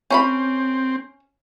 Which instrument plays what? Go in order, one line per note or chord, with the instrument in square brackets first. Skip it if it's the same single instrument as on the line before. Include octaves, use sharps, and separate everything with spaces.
[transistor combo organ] C4 [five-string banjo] C#4 A#5 B5